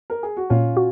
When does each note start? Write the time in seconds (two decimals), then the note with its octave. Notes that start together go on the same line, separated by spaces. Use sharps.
0.10 A#4
0.23 G#4
0.37 F#4
0.50 A#2 C#4 F4
0.77 F#4